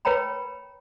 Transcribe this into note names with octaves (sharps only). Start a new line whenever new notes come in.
B4 C#5 G5 A#5 B5